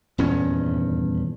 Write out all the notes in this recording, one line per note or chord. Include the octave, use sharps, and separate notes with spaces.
D#1 E2 G2 C#4